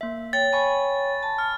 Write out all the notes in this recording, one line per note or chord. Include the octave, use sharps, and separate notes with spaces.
A#3 E5
C#5 G5 A6
G#5 B5 C#6
A5
F6